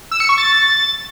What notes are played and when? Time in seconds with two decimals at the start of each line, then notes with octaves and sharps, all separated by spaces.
0.11 E6
0.20 C#7
0.29 C#6
0.38 A6